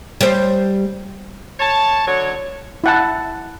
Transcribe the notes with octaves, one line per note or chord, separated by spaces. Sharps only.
G3 C5
C#5 A5
D3 F#3 C#5
E4 F#5 A5